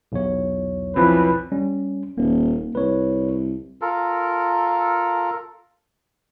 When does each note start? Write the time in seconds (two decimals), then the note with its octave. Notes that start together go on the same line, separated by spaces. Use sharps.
0.12 B1 E2 C#5
0.96 E3 F3 C4 B4
1.52 G3 C#4
2.18 D#1 A#3
2.75 C2 B4 C#5
3.82 F4 A4 A#4